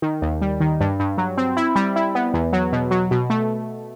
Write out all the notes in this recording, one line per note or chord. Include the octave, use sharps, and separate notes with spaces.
D#3
D#2
G3
D#3
G2
G2
F#3
C4
E4
G3
E4
B3
E2
F#3
B2
F#3
B2
A3